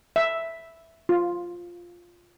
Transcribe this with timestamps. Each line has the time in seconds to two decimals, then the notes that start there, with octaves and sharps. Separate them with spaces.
0.16 E5
1.09 F4